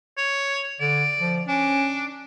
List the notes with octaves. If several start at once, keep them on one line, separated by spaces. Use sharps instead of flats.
C#5
D3 D5
F3
C#4 D4